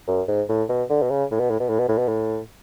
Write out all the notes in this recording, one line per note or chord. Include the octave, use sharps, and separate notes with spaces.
F#2
G#2
A2
B2
D3
B2
C#3
A2
B2
A2
B2
A2
B2
A2
B2
A2